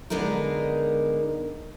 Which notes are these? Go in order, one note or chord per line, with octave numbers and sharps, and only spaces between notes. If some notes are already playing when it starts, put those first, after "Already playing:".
D3 G#3 B3 D#4 A#4